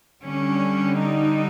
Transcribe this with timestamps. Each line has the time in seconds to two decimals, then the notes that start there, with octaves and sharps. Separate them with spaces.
0.23 D3 G3 C#4
0.97 D#4